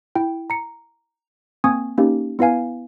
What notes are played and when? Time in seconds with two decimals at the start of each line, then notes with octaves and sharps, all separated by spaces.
0.15 E4 G5
0.50 A#5 C#7
1.64 A#3 C4 G#5 C#6 D#6 G#6
1.98 A#3 C#4 D#4 G4
2.39 B3 E4 B4 F5 G#5